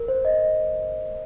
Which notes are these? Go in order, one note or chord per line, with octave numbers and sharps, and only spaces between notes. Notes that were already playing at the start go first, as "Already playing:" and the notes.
Already playing: A#4
C5
D#5